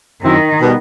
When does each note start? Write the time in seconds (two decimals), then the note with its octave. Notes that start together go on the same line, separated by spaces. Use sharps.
0.22 F#2 D#3 F#3 C4 E4
0.60 B2 G3 B3